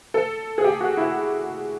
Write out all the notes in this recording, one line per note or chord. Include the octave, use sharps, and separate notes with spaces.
A4
G#4
G4
F#4
E4